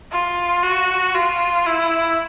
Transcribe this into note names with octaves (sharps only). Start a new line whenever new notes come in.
F4
F#4
F4
E4